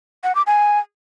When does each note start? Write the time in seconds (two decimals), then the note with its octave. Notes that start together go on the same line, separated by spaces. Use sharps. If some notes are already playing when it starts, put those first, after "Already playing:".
0.24 F#5
0.35 D6
0.47 G#5